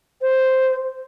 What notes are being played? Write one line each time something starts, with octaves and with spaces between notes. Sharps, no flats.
C5